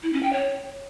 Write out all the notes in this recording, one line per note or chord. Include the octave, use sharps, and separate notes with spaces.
E4
C#4
G5
C#5